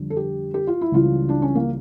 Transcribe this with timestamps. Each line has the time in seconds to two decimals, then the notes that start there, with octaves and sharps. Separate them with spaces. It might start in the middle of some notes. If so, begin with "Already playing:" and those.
Already playing: F2 D3 G3
0.10 A4
0.17 G4
0.54 G4
0.67 F4
0.81 E4
0.92 C#2 C#3 E3 G3 F4
1.29 D4
1.42 C#4
1.55 A#3